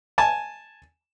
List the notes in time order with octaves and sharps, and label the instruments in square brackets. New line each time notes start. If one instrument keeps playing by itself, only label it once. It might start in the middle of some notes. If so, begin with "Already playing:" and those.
[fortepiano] G#5 A5